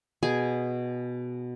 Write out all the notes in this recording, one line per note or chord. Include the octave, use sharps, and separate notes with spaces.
B2 G#4 G#5